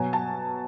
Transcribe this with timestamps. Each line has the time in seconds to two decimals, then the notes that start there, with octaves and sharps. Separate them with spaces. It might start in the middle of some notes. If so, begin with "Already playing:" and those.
Already playing: B2 F#3 G#5
0.13 A5